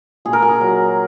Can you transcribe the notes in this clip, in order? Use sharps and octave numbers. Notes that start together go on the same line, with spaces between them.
A#2 G#4
A#4
G#4
F#3